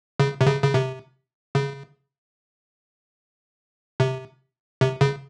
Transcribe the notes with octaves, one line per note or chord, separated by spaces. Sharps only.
C#3
C3
C#3
C#3
C3
C#3
C3
C3
C#3